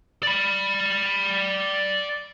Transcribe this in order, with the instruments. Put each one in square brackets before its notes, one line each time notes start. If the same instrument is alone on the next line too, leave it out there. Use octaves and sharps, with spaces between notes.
[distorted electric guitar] D5 B5